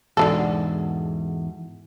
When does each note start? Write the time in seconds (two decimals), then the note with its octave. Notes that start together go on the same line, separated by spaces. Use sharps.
0.17 E2 G#2 B2 D3 G#3 A4